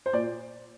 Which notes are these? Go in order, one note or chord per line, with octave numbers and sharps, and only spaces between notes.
C5
A#2 D5